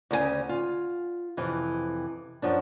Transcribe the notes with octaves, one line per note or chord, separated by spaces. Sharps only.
D2 C#3 A#4 G#5
F4
F2 C3 E3
F#2 F3 D4